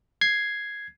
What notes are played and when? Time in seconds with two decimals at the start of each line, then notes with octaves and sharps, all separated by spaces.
0.21 G#6 C7